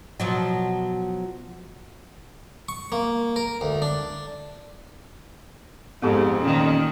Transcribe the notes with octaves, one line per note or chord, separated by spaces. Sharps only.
B2 F3 F#3
C#6
A#3
A#4
D2
D4
F2 G#2 B3 G4 A4
A#2 D#3 C#4